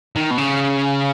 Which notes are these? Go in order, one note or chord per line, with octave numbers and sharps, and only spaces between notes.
D#3
B2
C#3